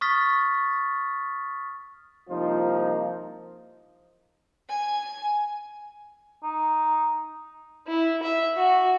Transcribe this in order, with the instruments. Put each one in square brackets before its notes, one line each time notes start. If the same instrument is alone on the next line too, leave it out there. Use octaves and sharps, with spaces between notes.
[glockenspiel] C#6 D#6 F6 A6 B6
[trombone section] C2 F3 A#3 D#4 F4 C5
[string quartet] G#5
[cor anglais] D#4
[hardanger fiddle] E4
E5
F#4